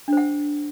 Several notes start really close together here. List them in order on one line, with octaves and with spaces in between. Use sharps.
D4 C5 F#5